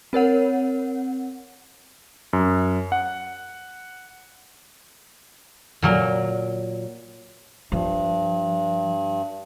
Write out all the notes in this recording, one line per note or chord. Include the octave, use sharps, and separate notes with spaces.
C4 A#4 C#5 F#5
F#2
F#5
A#2 F#3 A#4
G2 F3